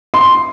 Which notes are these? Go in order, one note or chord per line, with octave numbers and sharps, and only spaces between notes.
C6